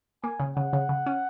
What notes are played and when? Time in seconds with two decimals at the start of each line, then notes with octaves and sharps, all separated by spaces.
0.24 A#3 G#5
0.40 C#3
0.56 C#3 F#5
0.73 C#3
0.89 C#3
1.06 C#4